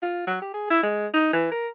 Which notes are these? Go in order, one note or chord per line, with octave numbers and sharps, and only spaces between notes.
F4
F#3
G4
G#4
E4
G#3
D#4
E3
A#4